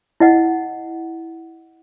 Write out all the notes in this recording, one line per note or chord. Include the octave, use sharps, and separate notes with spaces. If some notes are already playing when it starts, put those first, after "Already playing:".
E4 D#5 F#5